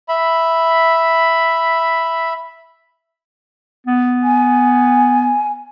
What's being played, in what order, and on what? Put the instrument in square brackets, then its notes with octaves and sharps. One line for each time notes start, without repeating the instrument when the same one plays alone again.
[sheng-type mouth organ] E5 B5
[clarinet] B3
[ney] G#5